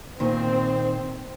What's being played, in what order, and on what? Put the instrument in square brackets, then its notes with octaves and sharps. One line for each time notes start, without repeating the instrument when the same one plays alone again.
[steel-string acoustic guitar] A#2 D#3 [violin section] C4